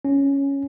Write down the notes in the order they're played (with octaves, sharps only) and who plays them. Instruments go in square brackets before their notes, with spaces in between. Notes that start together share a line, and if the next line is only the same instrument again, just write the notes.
[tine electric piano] C#4